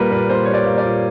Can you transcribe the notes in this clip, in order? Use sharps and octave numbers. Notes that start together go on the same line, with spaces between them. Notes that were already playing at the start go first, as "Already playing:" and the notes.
Already playing: A#2 G3 A#3 A#4 B4
A#2 B4
A#2 C5
G3 C#5
D5
A#3
D5
A#2